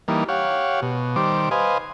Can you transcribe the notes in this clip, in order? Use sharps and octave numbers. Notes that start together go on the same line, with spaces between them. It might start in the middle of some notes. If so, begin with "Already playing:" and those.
E3 G3 A#3 D#4
G4 C#5 F5 F#5
B2
D#3 G3 C5 D6
B4 C5 D#5 F5 G#5